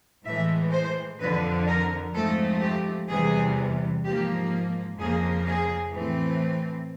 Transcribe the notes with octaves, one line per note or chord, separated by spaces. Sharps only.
A2 E3 G#3 E5
C5
F2 D3 F3 B4
A#4
G#2 F3 A3 C4 A4
G4
E2 C3 E3 G3 G#4
G#2 F3 A#3 G4
F2 C#3 F3 A#3 G#4
G#4
A2 E3 A3 C4